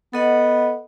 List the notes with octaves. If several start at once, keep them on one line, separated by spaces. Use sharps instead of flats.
B3 A4 D#5 F#5